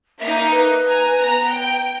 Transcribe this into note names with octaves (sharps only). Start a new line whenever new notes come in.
A#3 D#4 E5
B4
G#5 A#5
B3 A#5
G5